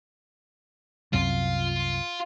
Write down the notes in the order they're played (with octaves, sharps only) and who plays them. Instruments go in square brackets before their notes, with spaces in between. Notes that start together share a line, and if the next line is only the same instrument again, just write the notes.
[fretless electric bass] C2 F#2 C3 [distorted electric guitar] F4